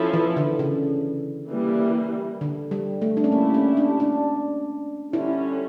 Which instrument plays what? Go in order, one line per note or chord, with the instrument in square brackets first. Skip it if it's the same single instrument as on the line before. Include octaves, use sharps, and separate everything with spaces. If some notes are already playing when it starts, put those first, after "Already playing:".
Already playing: [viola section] F3 C#4 E4 A4
[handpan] E3
D3
C#3
[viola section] E3 G3 A#3
[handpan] D3
G3
A3
D4
C#4
[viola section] A3 E4 G4 [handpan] A#3
[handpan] C#4
D4
D4
[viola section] D3 G3 C#4 [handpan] E4